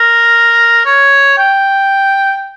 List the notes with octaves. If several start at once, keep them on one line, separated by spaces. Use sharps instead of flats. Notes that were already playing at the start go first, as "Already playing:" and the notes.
Already playing: A#4
C#5
G5